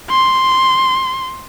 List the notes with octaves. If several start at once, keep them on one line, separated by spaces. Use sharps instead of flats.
C6